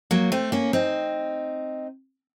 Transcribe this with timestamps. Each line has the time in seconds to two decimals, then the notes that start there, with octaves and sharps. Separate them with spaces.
0.11 F#3 A#3
0.32 A3 C4
0.52 A#3 C#4
0.73 C4 D#4